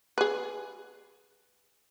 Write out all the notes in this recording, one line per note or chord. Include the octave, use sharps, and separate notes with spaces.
G#4 B4